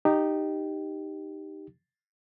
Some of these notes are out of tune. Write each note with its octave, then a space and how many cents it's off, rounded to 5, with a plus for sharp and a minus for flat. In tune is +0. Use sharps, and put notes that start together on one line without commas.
D#4 -10 G4 +0